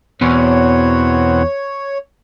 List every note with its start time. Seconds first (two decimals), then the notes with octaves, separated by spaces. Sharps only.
0.21 E2 B2 C4 F#4 C#5